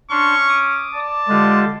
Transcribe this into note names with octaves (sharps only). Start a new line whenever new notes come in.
C#4 D4 C6 C#6
D6 D#6
D5 A5
D3 G#3 F4 G4